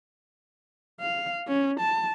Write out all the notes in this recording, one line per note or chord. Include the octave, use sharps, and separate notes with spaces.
F5
C#4
A5